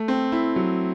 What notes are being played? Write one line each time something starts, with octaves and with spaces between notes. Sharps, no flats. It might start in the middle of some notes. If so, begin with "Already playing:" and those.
Already playing: A3
C4
E4
F#3